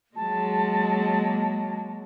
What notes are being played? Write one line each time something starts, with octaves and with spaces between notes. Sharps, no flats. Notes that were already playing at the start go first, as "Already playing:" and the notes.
F#3 G#3 A#3 A5